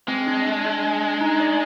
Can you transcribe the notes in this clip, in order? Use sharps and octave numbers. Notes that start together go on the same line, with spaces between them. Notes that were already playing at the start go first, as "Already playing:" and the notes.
G#3 C4
D4
D4
D4
D4
D#4
D5